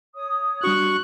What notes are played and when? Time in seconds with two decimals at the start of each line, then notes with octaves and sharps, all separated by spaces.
0.15 C#5 D#6
0.64 G3 D4 F#4 C#6 F#6